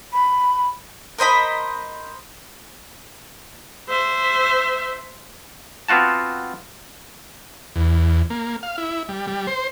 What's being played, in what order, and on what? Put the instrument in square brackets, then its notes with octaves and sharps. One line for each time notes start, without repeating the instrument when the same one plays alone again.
[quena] B5
[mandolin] A#4 C5 D#5 B5
[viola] C5 E5
[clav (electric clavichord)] B3 C4 F4 F#4 A5
[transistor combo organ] E2
A#3
F5
E4
G3
G3
C5